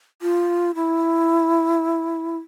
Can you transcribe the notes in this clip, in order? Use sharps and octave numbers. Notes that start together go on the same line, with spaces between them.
F4
E4